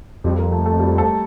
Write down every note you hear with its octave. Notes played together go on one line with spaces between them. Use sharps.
F2 G3 G4
A#3 A#4
A3 A4
A3 A4
G3 G4
A3 A4